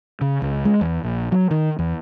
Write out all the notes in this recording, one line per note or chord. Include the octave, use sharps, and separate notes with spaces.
C#3
C#2
G#3
E2
A#1
F#3
D#3
E2